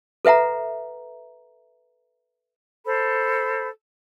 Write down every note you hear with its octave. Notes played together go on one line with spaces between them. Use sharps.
A4 B4 E5 F#5 A#5
A4 C5 B5